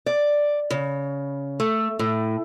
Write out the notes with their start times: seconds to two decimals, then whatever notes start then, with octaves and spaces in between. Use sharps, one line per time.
0.06 D5
0.70 C#3
1.60 A3
1.99 A2